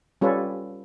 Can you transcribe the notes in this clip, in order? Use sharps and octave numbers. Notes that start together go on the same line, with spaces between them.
G3 C#4 F4 A4 B4 C#5